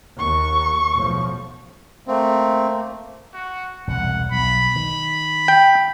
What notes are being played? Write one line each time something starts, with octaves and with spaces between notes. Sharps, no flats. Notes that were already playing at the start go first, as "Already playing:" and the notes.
D#2 C#6
B1 A2 F3
A3 A#3 C4
F#4
E1 C2 A#2 F#5
B1 B5
D#3
G5